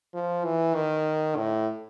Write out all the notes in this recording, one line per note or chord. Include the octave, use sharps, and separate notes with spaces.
F3
E3
D#3
A2